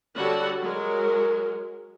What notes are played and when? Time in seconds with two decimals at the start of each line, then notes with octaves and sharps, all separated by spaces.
0.15 D3 G3 F#4 A4 C#5 F#5
0.60 F#3 G#3 A#4